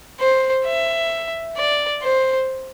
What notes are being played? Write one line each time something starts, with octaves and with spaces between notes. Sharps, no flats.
C5
E5
D5
C5